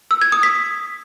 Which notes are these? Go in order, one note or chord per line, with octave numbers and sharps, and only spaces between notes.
E6
G#6
D#6
B6